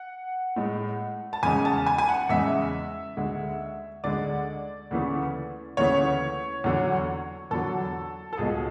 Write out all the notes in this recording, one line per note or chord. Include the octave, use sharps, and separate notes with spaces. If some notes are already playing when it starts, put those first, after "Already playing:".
Already playing: F#5
A2 G#3
A5
E2 C#3 G#3 G#5
A5
G#5
G#5
F#5
E2 C#3 G#3 E5
D2 D3 G#3
D2 D3 G#3 D5
D2 C#3 E3 A3
D2 C#3 E3 A3 C#5
E2 D3 F#3
E2 D3 F#3 A4
A4
C#2 B2 G#3 G#4